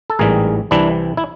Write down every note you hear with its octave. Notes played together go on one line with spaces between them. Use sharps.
A4
A1 G#2 E3 G3 G#4 A#4
C2 C3 E3 D4 E4
E4